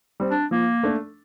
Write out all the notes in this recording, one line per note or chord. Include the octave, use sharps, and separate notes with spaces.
G3 C4
D4
F3 A#3
A3 D4